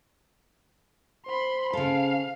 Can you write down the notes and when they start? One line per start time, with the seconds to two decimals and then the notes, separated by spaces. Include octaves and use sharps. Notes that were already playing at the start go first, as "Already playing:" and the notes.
1.26 C5 B5 C6
1.73 C#3 A4 F5